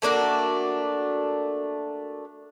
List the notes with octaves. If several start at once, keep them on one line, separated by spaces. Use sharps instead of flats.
A3 A#3 D4 F#4